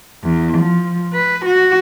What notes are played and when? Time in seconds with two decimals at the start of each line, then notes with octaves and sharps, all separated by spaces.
0.24 E2
0.58 F3
1.13 B4
1.45 F#4